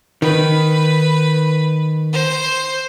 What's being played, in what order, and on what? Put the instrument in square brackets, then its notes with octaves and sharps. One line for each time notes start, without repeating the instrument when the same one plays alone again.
[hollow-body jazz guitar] D#3 [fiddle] B4
[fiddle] C5